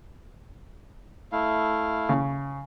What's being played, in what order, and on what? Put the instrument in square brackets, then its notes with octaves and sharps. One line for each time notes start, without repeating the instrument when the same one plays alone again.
[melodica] A3 E4 F5
[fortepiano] C#3